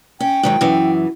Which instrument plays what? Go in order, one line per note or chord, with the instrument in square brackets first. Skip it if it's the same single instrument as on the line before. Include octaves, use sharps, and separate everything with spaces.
[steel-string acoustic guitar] C#4 [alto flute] G5
[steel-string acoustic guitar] G#2 D#3 F#3
F#2 E3